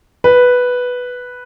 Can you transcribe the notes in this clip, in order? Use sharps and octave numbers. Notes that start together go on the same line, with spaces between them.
B4